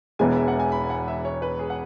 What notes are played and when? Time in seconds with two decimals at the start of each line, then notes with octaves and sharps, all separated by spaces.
0.19 E1 E2 E3 G#3 G#5
0.36 E5
0.48 F#5
0.59 G#5
0.72 B5
0.90 F#5
1.08 E5
1.25 C#5
1.42 B4
1.59 G#4
1.70 F#5